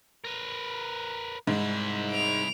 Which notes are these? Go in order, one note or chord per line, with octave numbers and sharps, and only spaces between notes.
A#4 B4
C2 G#2 E4
D7 F7